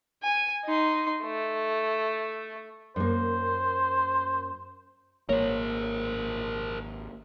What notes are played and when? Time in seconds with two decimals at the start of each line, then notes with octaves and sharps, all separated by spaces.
0.23 G#5
0.65 D#4 C6
1.24 A3
2.96 F#2 A#3 C5
5.29 G#1 A#3 A#4 C5 C#5